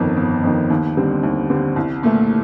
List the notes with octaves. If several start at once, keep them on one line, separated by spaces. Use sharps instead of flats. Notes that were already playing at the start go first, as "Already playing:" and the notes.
Already playing: G1 F2 D#3
G1
F2 D#3
D#2
D3 G3 C4
D#2
D3 G3 C4
C2
A#2 A3